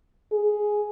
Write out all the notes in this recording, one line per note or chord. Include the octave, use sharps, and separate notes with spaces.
G#4